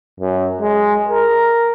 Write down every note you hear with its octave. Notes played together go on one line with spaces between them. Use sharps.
F#2
G#3
A#4